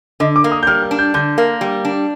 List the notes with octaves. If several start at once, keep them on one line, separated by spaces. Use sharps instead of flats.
D3 D#5
D6
A#3
D#6
G6
G3 F6
F6
D4
G6
D3 G6
A#3
G3
D4